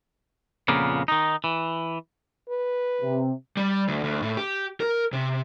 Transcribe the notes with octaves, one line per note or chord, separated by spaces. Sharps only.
F2 A#2 C#3 A#3 B3
D#3 D#4
E3
B4
C3
G3
D2
D2
A2
G4
A#4
C3